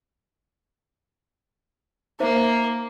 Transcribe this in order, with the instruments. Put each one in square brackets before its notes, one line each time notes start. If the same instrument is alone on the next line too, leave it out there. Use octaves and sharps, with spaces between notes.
[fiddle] A#3 [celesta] D#4 C5 E5